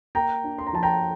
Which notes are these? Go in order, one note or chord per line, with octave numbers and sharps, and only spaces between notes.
A#3 G5 A#5
D4
C6
A#5
F3 A5
G5 A#5